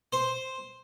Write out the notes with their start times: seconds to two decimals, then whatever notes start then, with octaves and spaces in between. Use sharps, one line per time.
0.13 C5